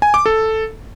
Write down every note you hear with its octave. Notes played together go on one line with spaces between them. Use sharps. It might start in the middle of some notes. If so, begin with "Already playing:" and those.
G#5
D6
A4